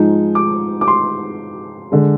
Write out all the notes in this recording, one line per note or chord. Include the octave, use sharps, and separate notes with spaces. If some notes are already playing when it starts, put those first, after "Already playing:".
Already playing: G#2 F3 G#3 D#4
D6
D6
C6
D3 G#3